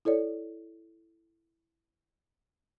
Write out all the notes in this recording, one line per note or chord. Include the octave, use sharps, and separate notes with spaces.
E4 A4 C#5 D5